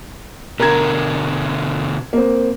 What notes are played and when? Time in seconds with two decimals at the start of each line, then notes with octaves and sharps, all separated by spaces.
0.60 B2 D3 A#4 A#5 G#6
2.13 A#3 C4